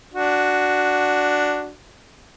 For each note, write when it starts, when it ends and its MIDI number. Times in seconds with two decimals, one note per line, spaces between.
0.14 1.72 62
0.14 1.72 66